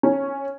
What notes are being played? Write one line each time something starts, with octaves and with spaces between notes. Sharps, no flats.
C#4